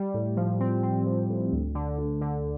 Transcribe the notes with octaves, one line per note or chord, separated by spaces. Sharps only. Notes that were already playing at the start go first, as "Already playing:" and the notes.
Already playing: G3
A2
F3
C4
C4
F3
A2
D2
D3
D2
D3